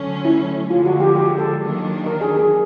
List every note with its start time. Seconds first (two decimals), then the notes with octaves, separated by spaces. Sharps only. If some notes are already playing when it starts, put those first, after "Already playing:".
Already playing: D3 F#3 A3 C#4
0.25 E4
0.70 D3 F3 G#3 F4
0.85 F#4
1.00 G4
1.15 G4
1.38 A4
1.61 D#3 F#3 A#3 D4
2.06 A#4
2.21 G#4
2.37 G#4